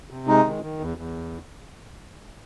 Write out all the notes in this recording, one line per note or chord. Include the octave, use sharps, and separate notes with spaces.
C3
G#3 D#4
D#3
D#3
E2
E2